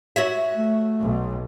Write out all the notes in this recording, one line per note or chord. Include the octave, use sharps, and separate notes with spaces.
F#4 C#5 E5
A3
B1